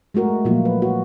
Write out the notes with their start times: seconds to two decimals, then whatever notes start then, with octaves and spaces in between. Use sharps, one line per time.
0.14 G#3 A3 F#4 A#4
0.45 A#2 F3 F#3 A#3 F4
0.65 B4
0.82 F#4